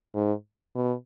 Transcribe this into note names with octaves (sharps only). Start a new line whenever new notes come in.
G#2
B2